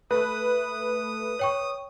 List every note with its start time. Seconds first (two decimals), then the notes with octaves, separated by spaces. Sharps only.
0.11 A3 B4 D#6
1.39 C#5 G5 C#6